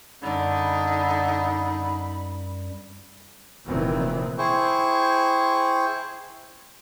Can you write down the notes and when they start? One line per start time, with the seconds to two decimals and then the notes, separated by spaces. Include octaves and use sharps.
0.23 F#2 D3 G3 D#4 B5
3.66 F1 A#2 D#3 E3 C4
4.38 E4 G#4 C5 G5 C#6